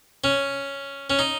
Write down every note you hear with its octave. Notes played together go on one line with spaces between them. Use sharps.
C#4
C#4
D#4